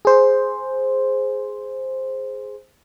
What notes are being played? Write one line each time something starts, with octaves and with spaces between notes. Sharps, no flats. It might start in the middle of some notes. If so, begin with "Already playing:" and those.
G#4 C5